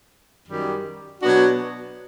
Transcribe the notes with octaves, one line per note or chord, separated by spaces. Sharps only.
F#2 D#3 G3
B2 F#3 B3 D4 F#4